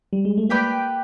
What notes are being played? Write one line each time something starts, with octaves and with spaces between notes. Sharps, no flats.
G3
G#3
A3
A#3 G4 B4 D5 G5